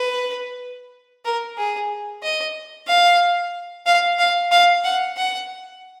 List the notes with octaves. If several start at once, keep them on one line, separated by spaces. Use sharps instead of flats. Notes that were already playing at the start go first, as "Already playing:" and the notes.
Already playing: B4
A#4
G#4
D#5
F5
F5
F5
F5
F#5
F#5